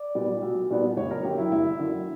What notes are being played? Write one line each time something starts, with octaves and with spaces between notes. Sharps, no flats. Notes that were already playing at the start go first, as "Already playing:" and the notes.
Already playing: D5
A#2 G3 B3 D4
B1
A#2 G3 B3 D4
F#1 C#5
A#4
F#2 D3 G4
E4
F#1 E4
F#2 D3